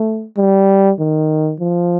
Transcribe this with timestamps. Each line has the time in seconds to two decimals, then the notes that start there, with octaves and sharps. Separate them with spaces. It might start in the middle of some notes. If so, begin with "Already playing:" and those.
Already playing: A3
0.37 G3
0.99 D#3
1.60 F3